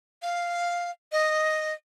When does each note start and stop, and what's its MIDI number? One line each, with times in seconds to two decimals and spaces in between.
0.22 0.91 77
1.12 1.73 75